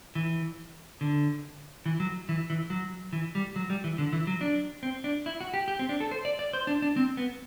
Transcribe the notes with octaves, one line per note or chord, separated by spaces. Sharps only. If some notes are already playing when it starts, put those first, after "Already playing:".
E3
D3
E3
F#3
E3
E3
F#3
E3
G3
F#3
G3
E3
D3
E3
F#3
D4
C4
D4
E4
F#4
G4
G4
C4
D4
A4
C5
D5
D5
C5
D4
D4
C4
B3